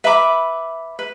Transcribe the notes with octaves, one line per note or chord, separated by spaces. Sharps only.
B4 E5 B5 D6
B4